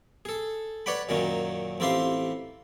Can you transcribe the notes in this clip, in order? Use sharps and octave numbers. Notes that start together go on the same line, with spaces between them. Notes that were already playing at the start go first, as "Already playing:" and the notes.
G#4 A4
B4 C#5 D5 F#5 G5 B5
F#2 A#2 D#3 F#3 C#4
A1 C4 E4 F4 G4 C6